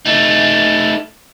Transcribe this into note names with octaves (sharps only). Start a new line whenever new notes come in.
A3 D#4